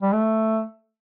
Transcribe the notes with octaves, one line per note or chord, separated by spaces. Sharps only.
G3
A3